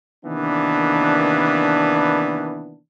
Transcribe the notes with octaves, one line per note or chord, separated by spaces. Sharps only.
C3 D#3 E3 A#3 B3 D4